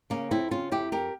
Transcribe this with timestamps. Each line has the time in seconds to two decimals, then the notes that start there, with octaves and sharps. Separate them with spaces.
0.10 C#3 A#3 C#4
0.31 F2 C4 E4
0.51 C#3 C#4 F4
0.71 F2 E4 G4
0.92 F2 G4 A#4